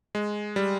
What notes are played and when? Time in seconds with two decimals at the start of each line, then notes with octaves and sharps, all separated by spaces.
0.15 G#3
0.56 G3